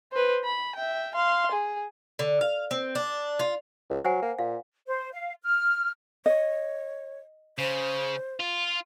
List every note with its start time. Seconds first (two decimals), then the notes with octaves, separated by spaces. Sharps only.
0.12 B4 C5
0.44 B5
0.76 E5 G5
1.15 F5 C6
1.52 G#4
2.19 D3
2.41 F5
2.71 C4
2.95 D4
3.39 F4
3.90 C#2
4.05 F#3 C5 F#5 G#5
4.22 A#3
4.39 A#2 F5
4.87 C5
5.13 F5
5.43 F6
6.26 C#5 D#5
7.58 C#3 C5
8.40 F4